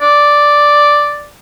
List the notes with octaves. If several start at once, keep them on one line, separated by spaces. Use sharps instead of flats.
D5